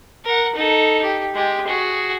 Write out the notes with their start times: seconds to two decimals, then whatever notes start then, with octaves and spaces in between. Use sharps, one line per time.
0.25 A#4 F#5
0.55 D#4 A4
1.03 G4
1.34 G#3 G4
1.67 F#4 G#4